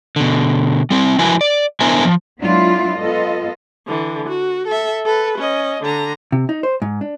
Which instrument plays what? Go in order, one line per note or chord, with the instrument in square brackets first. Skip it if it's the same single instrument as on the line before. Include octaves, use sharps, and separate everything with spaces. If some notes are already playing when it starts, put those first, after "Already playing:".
[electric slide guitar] B2 D3
G3 C4 E4
F3 E4 F#4 A#4 B4 G#5
D5
B3 D4 E4 A#4 C5 G#5
F3
[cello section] F#3 G#3 B3 D4 E4 F4
B3 F4 A4 D#5
[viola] D3 E3
F#4
A4 E5
A4 B4
C#4 D#5
D3 A#5
[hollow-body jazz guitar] C3
D#4
C5
G#2
D4